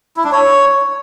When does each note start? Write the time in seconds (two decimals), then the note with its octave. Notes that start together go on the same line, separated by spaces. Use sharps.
0.17 E4
0.24 D4
0.32 C#5